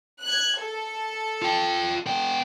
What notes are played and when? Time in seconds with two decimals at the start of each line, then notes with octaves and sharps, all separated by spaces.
0.23 F#6 G#6
0.60 A4
1.42 F4 G5
2.06 B3 G5